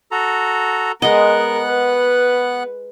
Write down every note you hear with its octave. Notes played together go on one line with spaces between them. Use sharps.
F#4 A4 A#5
G#3 B3 A#4 D#5 F#5 F#6
B4